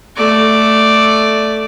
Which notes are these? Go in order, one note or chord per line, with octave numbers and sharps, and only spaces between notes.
A3 D5